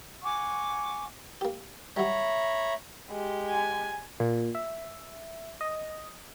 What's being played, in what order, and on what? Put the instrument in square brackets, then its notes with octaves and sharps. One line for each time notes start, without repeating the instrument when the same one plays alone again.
[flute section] F#5 G#5 C#6 D6
[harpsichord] A#3 G4
[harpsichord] F#3 G3 [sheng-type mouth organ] C#5 A#5 B5 [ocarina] E5
[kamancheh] G#3 G4
[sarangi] G#5
[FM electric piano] A#2
E5
D#5